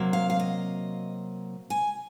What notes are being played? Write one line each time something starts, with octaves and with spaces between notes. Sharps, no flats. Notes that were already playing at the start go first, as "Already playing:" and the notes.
Already playing: C3 F#3 A#3
F5
F5
D#5
G#5